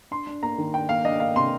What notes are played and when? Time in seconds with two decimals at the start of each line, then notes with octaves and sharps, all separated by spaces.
0.11 D4 C6
0.27 D4
0.42 A#3 A#5
0.58 D#3
0.74 D4 G5
0.89 A#3 F5
1.05 D4 D#5
1.20 A#3 F5
1.36 C3 C6